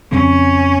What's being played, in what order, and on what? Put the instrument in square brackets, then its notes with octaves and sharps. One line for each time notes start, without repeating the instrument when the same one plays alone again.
[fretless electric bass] F2 C#3 F3 C4 [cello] C#4